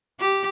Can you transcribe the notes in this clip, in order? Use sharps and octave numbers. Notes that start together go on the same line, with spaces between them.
G4